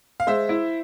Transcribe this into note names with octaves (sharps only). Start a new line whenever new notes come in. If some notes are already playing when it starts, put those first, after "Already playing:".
F5
G#3 C5 E5
E4